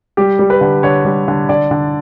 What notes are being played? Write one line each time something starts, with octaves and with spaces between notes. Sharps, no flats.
G3 G4
G3
B4
D3
D3 C#5
G3
D3
D3 D5
D3